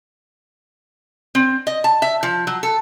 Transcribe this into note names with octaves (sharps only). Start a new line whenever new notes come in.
C4
D#5
A5
E5
F3
F#3
A4